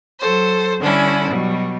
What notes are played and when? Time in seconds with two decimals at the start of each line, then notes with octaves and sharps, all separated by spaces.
0.20 F#3 A4 C5
0.80 D3 G3 C#4 D4 E4
1.31 B2 F#3 G3